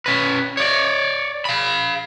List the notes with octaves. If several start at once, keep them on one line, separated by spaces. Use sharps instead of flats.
C#4 B4
C#5 D5
F5 B5